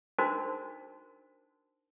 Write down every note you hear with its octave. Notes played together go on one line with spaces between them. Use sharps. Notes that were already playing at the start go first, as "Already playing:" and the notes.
D4 D#4 F#4 A#4 C5 A5